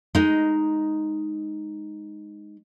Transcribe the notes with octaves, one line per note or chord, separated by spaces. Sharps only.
G#3 D#4